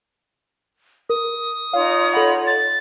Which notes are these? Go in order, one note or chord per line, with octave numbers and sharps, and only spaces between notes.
A#4 D#6
D#4 F4 C#5 F5
A4 F#5 B5
A6